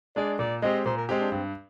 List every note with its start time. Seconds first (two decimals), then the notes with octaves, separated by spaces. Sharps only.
0.16 G#3 D4 G#4 D5
0.39 A#2 D5
0.62 G#3 C4 G4 D#5
0.85 A#2 C5
0.97 A#4
1.09 G#3 C4 G4
1.21 D4
1.32 G2 C4